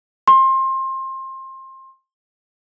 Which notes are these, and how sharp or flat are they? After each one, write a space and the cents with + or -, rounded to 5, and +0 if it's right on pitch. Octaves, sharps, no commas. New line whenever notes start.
C6 +25